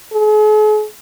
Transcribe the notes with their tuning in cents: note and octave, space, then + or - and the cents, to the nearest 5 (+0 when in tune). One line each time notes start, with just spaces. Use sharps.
G#4 +45